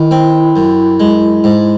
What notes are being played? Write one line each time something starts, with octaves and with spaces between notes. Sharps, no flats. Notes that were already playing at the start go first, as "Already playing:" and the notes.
Already playing: D#3 E4
C4
F#2
G#3
G#2